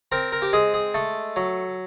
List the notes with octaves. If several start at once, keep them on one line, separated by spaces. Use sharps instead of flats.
C4 A#4
A#4
G4
G#3 G#4
G#4
A3 A4
F#3